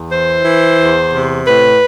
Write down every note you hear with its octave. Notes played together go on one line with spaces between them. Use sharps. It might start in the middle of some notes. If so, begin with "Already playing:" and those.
Already playing: E2
E3 C5
E3
E2
C3
A2 B4